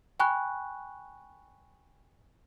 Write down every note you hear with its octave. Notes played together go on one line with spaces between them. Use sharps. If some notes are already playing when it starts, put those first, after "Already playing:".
G5 G#5 B5 C#6 F#6